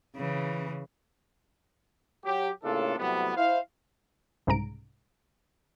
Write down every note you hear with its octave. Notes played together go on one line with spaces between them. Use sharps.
C#3 E3
F#3 G4
A2 C#3 A#3 D4 F4 A4
A2 C3 F#3 G3 B3
E4 C5 F5
C2 G#2 C#3 A#5 D7